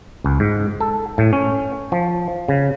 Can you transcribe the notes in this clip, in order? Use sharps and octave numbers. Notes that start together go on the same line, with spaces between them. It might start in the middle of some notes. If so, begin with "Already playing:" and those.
C#2
G#2
A4
A2
C#4
F3
C#3